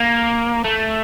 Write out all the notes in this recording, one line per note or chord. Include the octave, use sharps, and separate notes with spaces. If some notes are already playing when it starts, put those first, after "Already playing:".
Already playing: A#3
A3